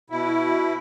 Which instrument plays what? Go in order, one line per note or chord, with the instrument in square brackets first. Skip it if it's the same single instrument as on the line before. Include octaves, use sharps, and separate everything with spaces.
[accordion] B2 E4